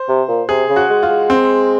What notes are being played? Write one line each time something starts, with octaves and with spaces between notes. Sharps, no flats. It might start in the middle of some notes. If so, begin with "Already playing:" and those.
Already playing: C5
C3
A#2
C3 G#4
C#3
F#4
G#3
F4
G#3
C4